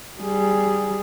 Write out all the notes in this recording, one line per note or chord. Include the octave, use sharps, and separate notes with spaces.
G3 G#4